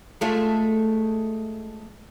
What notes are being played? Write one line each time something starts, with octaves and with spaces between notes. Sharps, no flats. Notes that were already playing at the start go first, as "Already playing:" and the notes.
G#3 A3 F4